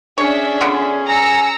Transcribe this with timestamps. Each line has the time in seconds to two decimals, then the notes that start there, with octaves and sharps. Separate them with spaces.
0.18 C#4 D4 G#4 C#5 E5
0.61 D3 B3 F4
1.06 G#5 A#5 E6 C#7